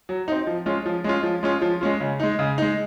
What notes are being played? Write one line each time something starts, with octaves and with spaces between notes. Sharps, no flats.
F#3
C4 D#4
F3
G#3 C#4 F4
F3
G#3 C#4 F4
F3
G#3 C#4 F4
F3
G#3 C#4 F4
C#3
G#3 D#4
C#3
G#3 D#4